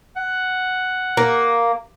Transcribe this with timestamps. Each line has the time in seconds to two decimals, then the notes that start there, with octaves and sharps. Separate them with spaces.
0.16 F#5
1.17 A#3